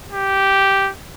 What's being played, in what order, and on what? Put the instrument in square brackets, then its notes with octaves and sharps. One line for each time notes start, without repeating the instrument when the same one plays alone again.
[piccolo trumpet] G4